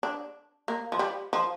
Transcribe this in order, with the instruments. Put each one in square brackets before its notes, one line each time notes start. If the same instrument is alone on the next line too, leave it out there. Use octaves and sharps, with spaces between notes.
[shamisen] D4
A#3
F3
G3
F3